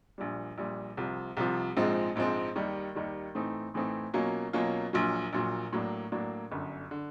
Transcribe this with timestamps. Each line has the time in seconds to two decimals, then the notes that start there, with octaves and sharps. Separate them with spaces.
0.18 A#1 A#2 G3
0.58 A#1 A#2 G3
0.97 C2 C3 F3
1.37 C2 C3 F3
1.77 A#1 G#2 F3 G#3 C4
2.16 A#1 G#2 F3 G#3 C4
2.56 D#2 D#3 G3
2.95 D#2 D#3 G3
3.35 A2 E3 A3 C4 D#4
3.74 A2 E3 A3 C4 D#4
4.14 B2 F#3 A#3 C#4 F4
4.53 B2 F#3 A#3 C#4 F4
4.93 A#1 A#2 F#3
5.33 A#1 A#2 F#3
5.73 A2 F#3 A#3 D4
6.12 A2 F#3 A#3 D4
6.51 G1 F#2 D3
6.91 D3